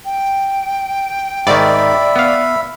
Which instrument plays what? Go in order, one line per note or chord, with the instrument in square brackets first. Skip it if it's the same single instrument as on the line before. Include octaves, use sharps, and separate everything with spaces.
[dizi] G5
[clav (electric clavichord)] G#2 D#3 [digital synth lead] D5 [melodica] E5 B5
[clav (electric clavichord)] B3 F5